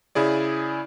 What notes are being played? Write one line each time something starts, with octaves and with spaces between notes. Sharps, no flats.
C#3 E4 G#4 D5